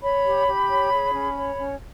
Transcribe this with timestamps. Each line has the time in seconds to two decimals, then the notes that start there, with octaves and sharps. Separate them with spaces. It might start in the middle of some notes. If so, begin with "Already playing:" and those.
0.02 C#5 B5
0.25 G4
0.47 G4
0.70 C#5
0.92 G#4
1.14 C#4
1.36 C#5
1.58 C#4